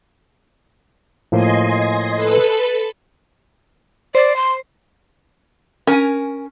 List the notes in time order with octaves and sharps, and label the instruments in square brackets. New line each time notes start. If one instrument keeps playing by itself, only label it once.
[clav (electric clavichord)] A2 F3 A#3 [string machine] D#5 G#5 C6
[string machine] A4 B4
[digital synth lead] C5 [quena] D5
[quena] C6
[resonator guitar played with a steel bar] C#4 G#5 [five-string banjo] A#4